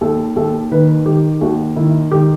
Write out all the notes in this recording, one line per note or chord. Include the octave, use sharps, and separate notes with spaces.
D#2 A4
D#2 A4
D#3 B4
D#3 G4
D#2 F#4
D#3 E4
D#3 G4